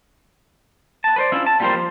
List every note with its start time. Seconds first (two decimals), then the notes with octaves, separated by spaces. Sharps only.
1.04 B3 A5
1.16 B4 C5 D5
1.32 C#4 D4 E4 F4 E5
1.46 A5
1.60 G3 A#3 F4 G4 A#4 C5
1.74 F3